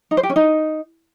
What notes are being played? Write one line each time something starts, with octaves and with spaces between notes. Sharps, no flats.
D#4
C5
G4
C#4
D#4